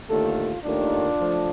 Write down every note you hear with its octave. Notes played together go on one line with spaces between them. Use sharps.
D#2 D3 A3 F4 A4
D#2 D#3 A3 D4 F4
F3 A3